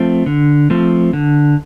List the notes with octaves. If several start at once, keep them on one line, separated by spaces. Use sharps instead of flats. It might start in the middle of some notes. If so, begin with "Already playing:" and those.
Already playing: F3 A3 C4
D3
F3 A3 C4
D3